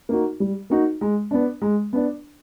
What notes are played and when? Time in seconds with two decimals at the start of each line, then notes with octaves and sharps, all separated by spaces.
0.09 A#3 D#4 F#4
0.40 G3
0.70 A#3 D#4 F#4
1.01 G#3
1.31 B3 D4
1.62 G#3
1.93 B3 D4